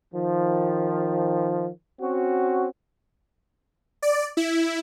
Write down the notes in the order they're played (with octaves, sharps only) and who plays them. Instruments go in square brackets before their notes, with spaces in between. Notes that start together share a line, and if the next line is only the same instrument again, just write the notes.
[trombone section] D#3 F3
C4 C#4 F#4
[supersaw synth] D5
E4